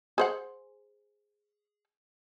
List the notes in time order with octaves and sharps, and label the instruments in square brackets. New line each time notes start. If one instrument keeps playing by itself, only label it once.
[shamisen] G#4 C5 F#5